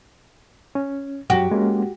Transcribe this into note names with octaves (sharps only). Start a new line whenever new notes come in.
C#4
F#2 F#3 F#4 G4
G#3 A#3 C#4